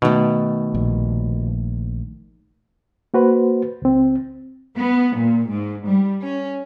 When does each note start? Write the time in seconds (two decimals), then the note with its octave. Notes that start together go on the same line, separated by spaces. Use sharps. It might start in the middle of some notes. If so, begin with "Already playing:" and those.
0.02 B2 D#3 A3
0.74 A#1
3.14 A#3 F#4 B4 C5
3.82 C#2 C4
4.77 B3
5.16 A#2
5.49 G#2
5.86 G3
6.21 C#4